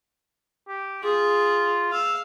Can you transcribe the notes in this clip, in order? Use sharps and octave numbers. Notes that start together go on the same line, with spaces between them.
G4
F4 G#4
F5 E6